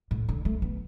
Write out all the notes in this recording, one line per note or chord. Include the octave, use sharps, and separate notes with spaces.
A2
D3
A3
B3